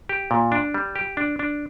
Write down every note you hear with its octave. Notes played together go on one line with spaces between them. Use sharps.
G4
A#2
D4
G3
G4
D4
D4